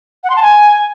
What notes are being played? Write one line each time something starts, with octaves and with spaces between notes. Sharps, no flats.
F#5
C6
A5
G#5